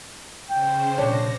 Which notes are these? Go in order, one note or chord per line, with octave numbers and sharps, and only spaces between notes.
C#3 C5 G5
A#1 C3 D4 C#5 A#6